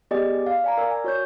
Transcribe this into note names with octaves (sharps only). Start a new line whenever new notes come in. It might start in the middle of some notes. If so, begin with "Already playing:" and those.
B3 G4 G#4 D5 D#5 G#5
F5
D5 G#5 A#5
A#4 D5 G#5 E6
G#5
F#4 C#5 G6